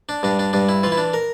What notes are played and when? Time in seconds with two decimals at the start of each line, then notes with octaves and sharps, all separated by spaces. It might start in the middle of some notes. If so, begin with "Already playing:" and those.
0.09 D4
0.23 G2 D4
0.39 D4
0.53 G2 D4
0.69 E4
0.83 E3 F4
0.92 E4
0.97 D4
1.14 A#4